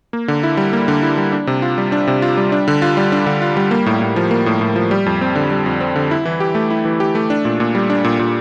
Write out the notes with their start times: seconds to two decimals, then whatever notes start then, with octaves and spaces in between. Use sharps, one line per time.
0.13 A#3
0.28 D3
0.43 E4
0.57 G3
0.73 A#3
0.88 D3
1.03 E4
1.17 G3
1.32 D4
1.47 C3
1.62 F4
1.78 G3
1.92 D4
2.07 C3
2.22 F4
2.37 G3
2.52 D4
2.68 D3
2.82 F4
2.97 G3
3.12 D4
3.26 D3
3.42 F4
3.57 G3
3.71 A#3
3.86 A2
4.02 A2
4.16 F3
4.31 A#3
4.46 A2
4.61 A2
4.76 F3
4.91 G3
5.06 F2
5.21 C4
5.35 D3
5.51 G3
5.66 F2
5.81 C4
5.96 D3
6.11 E4
6.25 E3
6.40 G4
6.55 A3
6.70 E4
6.85 E3
7.00 G4
7.15 A3
7.30 D4
7.45 A#2
7.60 A#2
7.75 G3
7.90 D4
8.04 A#2
8.19 A#2